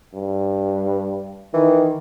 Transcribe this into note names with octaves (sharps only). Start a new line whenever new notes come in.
G2
D#3 E3